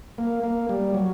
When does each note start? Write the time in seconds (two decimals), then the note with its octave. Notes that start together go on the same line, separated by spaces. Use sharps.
0.18 A#3
0.43 A#3
0.69 G3
0.94 F#3